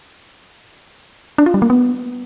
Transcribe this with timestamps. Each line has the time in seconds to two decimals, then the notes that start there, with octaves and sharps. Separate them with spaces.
1.38 D4
1.46 F4
1.54 G3
1.62 A#3
1.70 B3